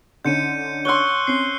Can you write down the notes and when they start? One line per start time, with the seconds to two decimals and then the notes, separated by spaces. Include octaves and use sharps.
0.25 D3 C#4 D#4 G6 C#7 D#7
0.85 C#5 C6 E6 F#6 G7
1.27 C4 C#4 C7 G7